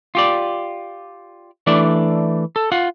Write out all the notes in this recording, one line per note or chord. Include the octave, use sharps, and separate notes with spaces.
F4 G4 D5
E3 A3 D4 D5
A4
F4 F#5